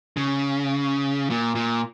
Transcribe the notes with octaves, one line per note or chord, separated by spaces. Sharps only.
C#3
A#2
A#2